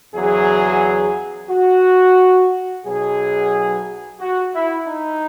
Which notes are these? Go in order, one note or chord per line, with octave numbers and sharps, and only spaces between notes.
E2 C#3 F#3 G#4
F#4
B1 B2 F#3 G#4
F#4
E4
D#4